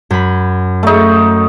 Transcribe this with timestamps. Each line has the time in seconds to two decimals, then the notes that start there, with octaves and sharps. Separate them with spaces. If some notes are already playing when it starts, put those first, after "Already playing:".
0.11 F#2 B5
0.83 A3 D#4